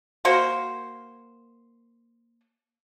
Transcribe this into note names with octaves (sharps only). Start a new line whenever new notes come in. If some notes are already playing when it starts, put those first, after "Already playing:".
A#3 F#4 A#4 C5